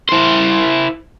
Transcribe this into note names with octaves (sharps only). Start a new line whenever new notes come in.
E4 C5